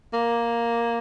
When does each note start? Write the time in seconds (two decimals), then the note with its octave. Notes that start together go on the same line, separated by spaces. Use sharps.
0.13 A#3